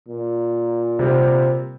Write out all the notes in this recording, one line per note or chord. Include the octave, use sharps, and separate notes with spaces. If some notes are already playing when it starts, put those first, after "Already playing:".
A#2
C3 G3 C4